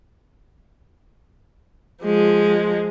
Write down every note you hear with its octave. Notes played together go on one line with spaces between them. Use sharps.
F3 G#3